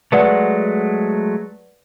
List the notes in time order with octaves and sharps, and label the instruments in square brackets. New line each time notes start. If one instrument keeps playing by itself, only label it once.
[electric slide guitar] F#3 G#3 A3 [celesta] B4 D5 F#5